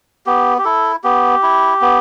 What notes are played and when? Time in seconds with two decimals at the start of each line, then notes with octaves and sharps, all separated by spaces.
0.26 B3 G4
0.58 G4
0.65 E4 A4
1.04 B3 G4
1.43 E4
1.81 B3